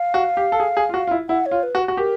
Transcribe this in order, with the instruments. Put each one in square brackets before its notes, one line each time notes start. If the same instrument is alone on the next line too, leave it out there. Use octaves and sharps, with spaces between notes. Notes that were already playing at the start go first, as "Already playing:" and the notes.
Already playing: [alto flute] F5
[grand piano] F#4
G4
A4
G#4
G#4
F4
F#4
F4
E4
[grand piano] E4 [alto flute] F#5
[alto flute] C#5
[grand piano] F4
[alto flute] B4
[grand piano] F#4
F#4
[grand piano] G4 [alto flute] A#4